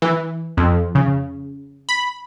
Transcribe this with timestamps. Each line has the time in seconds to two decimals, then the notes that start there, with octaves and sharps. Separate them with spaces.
0.02 E3
0.57 F2
0.95 C#3
1.89 B5